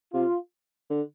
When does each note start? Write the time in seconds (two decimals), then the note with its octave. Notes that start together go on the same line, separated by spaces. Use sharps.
0.13 C3 F4
0.90 D3